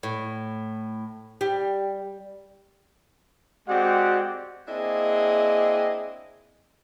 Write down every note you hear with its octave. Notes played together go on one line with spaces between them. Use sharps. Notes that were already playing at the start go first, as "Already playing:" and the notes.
A2
G3
G#3 C4 F#4 G4 D5 F#5
A#3 C4 D4 E4 G#4 D#5